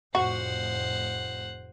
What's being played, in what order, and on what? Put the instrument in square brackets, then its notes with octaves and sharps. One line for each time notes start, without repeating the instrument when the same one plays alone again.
[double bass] F1 A2 [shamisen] F#4 [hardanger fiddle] C5 F#5